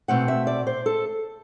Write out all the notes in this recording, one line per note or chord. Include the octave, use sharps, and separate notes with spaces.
B2 A3 C4 F#5
E5
D5
C5
A4